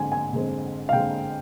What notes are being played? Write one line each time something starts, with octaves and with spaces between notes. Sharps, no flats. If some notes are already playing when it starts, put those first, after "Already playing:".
Already playing: D3 G#3 C4 G#5
G#5
D3 G#3 C4
F5
D3 G#3 C4 G5